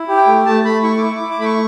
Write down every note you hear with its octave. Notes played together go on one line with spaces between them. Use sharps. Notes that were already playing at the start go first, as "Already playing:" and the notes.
Already playing: E4
G4
G5
A3
A3 A5
A3 B5
E4 C#6
D6
E4 C#6
E4 D6
D6
A3 B5
C#6